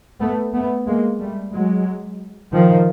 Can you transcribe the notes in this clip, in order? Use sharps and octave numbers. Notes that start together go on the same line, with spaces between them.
A3 B3
A3 B3
G#3 A#3
G3 A3
F#3 G#3
D#3 F3